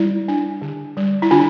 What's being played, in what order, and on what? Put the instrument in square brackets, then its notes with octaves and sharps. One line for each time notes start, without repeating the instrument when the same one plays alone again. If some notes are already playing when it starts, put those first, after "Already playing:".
Already playing: [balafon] G3 E4
D4
D3
G3
E4
D3 D4 F4